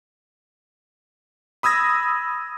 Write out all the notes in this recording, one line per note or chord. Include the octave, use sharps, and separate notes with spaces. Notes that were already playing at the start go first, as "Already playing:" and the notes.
B5 D#6 E6 G#6 A#6